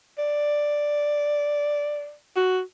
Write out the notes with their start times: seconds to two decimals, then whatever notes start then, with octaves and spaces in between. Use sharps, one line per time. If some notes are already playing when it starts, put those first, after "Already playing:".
0.18 D5
2.36 F#4